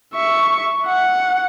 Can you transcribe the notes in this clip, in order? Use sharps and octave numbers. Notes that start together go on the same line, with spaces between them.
E5 C#6
F#5